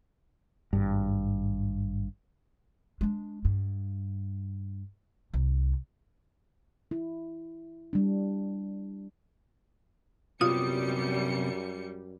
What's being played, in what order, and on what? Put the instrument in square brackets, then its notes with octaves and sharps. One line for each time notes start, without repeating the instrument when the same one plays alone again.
[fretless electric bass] G#1 G2
[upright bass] G#3 D4
G2
C2
[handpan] E4
G3 D4
[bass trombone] F#2 [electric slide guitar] C3 F#3 B3 [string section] G3 C#7 [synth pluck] F4 D#6